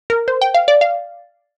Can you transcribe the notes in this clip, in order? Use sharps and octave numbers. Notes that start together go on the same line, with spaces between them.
A#4
C5
G5
F5
D5
F5